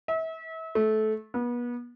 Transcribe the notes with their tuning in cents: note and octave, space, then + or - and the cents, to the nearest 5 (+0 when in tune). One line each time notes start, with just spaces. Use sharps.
E5 -35
A3 -20
B3 -35